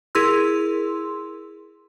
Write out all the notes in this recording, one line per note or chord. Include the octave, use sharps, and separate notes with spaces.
E4 G#4 A#4 C6 E6